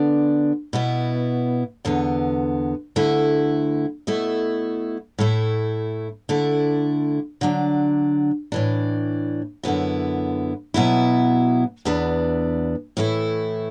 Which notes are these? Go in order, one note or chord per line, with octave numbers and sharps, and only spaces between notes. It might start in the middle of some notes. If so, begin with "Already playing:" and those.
Already playing: D3 B3 D4
B2 B3 E4
E2 D3 B3
D2 D3 A3 E4
B2 A3 E4
A2 A3 E4
D3 A3 E4
D3 F#3 D4
A2 E3 D4
F#2 D3 B3 E4
B2 F#3 B3 E4
E2 E3 B3 D4
A2 E3 A3 E4